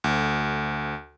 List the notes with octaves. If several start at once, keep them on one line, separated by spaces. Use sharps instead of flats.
D2